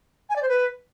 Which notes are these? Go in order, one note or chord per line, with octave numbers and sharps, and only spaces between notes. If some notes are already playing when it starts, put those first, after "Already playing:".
G#5
D5
C5
B4